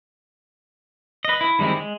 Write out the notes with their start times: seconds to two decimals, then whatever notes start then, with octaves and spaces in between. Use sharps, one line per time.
1.25 B4 D#5
1.41 E4
1.59 D#3 G3 G#3 C4 E4
1.77 G#3